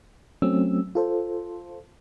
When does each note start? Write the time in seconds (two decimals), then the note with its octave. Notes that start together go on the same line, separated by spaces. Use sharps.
0.42 F#3 A3 C4 C#4 E6
0.95 F4 A4 C5